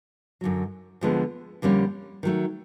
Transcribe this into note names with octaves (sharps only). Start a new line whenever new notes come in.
F#2 D3 F#3
D2 D3 F3 G#3 B3
F2 D3 G3 A#3 C#4
D#3 F#3 A3